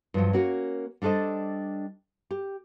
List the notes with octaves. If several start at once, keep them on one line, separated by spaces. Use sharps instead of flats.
G2 F3 F#3
A#3 C#4 F#4 A#4
G3 D4 A4 C5 D#5
G4